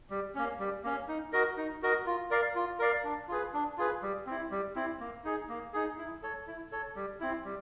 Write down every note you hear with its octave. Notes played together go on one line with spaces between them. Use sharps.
G3
A#3 C#4
G3
A#3 C#4
D#4
F#4 A#4 D#5
D#4
F#4 A#4 D#5
F4
A#4 D5 F5
F4
A#4 D5 F5
D4
F4 G#4 B4
D4
F4 G#4 B4
G3
C4 E4
G3
C4 E4
A#3
D#4 G#4
A#3
D#4 G#4
E4
A4 C#5
E4
A4 C#5
G3
C4 E4
G3